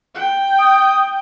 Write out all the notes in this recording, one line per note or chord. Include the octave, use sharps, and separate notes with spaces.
G5
D#6